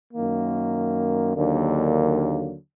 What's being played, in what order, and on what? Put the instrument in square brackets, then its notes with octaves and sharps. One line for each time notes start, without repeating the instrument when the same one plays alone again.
[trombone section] F#2 D#3 A#3
D#2 D3 F#3 A#3 D4